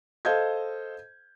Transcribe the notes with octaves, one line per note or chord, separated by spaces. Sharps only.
A4 C5 D#5 F5 G6 G#6